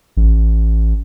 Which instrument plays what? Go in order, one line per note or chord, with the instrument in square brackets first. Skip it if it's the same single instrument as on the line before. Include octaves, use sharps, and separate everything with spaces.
[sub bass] A1